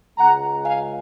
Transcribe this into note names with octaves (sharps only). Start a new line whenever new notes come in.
C#2 C#3 G#3 F#5 A#5
F5 G#5